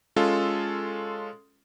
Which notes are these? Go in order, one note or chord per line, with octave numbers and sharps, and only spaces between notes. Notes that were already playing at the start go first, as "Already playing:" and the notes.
G#3 C#4 F4 A4